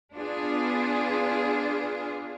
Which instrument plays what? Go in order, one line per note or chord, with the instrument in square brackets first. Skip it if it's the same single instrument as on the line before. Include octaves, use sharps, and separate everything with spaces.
[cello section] B3 D4 F4 G#4